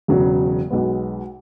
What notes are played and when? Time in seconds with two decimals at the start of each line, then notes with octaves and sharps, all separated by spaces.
0.08 E1 E2 C#3 F#3
0.71 B1 B2 G#3 B3